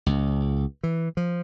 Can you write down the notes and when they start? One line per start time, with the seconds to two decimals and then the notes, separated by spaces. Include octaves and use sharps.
0.06 C#2
0.83 E3
1.17 F3